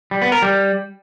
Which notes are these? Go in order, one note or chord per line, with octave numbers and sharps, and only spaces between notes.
G3
B3
A#4
G3